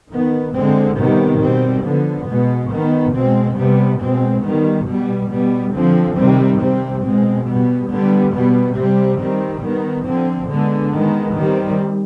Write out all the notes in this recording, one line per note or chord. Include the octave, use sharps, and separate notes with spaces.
D#3 B3
D3 G#3 C4
C3 D#3 G3 B3
B2 G3 C4
D3 F3 B3
B2 G#3 B3
D#3 B3
B2 G#3 C4
C3 G3 B3
B2 G#3 C4
D#3 G3 B3
B2 G3 B3
B2 G3 B3
D3 F3 C4
C3 D#3 G3 C4
C3 G3 C4
B2 G#3 C4
B2 G3 B3
D3 G3 B3
B2 G3 B3
C3 G3 C4
D#3 G3 C4
D#3 B3
D3 F3 C4
D3 G#3 B3
D#3 G#3 B3
D#3 G3 C4